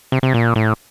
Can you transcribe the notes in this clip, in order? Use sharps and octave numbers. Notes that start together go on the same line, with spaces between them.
C3
C3
A#2
A2